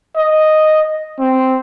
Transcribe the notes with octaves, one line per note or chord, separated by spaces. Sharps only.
D#5
C4